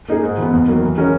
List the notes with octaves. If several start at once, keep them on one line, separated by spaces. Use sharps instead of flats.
A#3 D#4 G#4
G#2
E3 B3
E2
D#3 F#3 A#3
E3
G#3 C#4 F#4 A#4